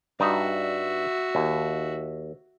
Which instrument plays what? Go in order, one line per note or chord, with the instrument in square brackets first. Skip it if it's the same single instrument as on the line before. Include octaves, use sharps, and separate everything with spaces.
[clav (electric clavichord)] G2 D#4 [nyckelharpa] F#4 E5
[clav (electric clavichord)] D#2